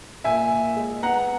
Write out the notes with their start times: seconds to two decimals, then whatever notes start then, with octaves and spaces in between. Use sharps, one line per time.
0.24 A#2 E5 G#5
0.51 A#2
0.76 G#3
1.03 B3 F#5 A#5